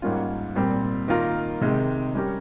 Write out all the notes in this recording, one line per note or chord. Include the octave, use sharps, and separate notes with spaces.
G#2 G3 A#3 C#4 F4
A#2 G3 C4
D#3 A#3 F4 A#4
C3 D#3 G#3
G3 C#4 G4 A#4